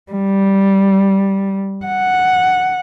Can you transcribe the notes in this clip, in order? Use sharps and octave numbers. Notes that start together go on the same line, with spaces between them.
G3
F#5